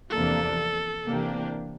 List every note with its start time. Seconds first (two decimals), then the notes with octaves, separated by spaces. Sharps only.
0.10 E2 C3 F3 A#3 D4 A4
1.06 C3 E3 A#3 D4 G4